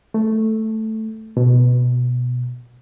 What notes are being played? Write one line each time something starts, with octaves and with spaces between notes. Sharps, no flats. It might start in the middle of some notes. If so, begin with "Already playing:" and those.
A3
B2